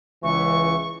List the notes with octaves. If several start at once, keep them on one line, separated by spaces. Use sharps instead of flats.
C#2 E3 C#6